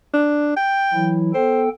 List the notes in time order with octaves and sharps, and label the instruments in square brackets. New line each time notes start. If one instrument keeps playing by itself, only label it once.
[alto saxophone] D4
G5
[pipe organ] E3 F#3 E4
[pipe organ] B3 A4 G5 [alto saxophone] C5